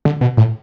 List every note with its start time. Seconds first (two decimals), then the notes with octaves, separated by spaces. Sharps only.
0.05 D3
0.21 B2
0.37 A2